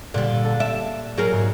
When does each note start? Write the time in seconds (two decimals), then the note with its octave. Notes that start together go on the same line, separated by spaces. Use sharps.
0.14 A#2 D3 G3
0.44 A4
0.60 D5 E5
1.17 F#3 G#4 A#4
1.32 G#2